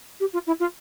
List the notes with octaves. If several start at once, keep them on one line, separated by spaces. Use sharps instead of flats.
G4
F4
E4
F4